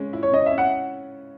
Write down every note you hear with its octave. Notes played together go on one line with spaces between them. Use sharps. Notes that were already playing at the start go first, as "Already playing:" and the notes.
Already playing: C#3 G#3 C#4
E4
C#5
C#3 D#5
E5
C#4
F#5